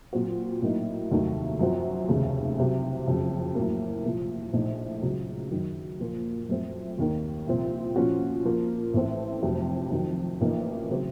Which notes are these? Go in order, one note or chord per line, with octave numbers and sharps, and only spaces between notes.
A#2 F#3 C4 F#4
A2 F#3 A#3 D#4
F1 D#2 D#3 F#3 A3
F#2 F3 C4 F#4
F1 D#2 C#3 A3
C2 C3 F#3
F#1 F2 C#3 F#3
A2 F#3 A#3
C2 A#2 F3
A#1 A2 A3 D#4
C#2 C#3 F#3
F#2 D#3 F#3
A#2 F3 A#3 F4
F#2 F3 A3 C4
D#2 D#3 A#3
C2 A#2 F3 C4
A#2 F3 A3 C#4 F#4
A#2 F3 A#3
A1 A2 A3 C4
F1 F2 C3 F#3
F2 D#3 F#3
A1 A2 F3 A#3 D#4
C#3 F#3 C4